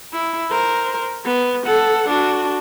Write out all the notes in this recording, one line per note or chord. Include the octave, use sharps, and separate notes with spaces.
E4
A#4 C5
B3
A4 F#5
D4 F#4